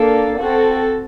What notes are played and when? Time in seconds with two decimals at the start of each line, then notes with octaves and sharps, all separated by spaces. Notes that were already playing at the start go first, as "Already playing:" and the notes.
Already playing: A#3 D4 A4
0.40 C4 F#4 A4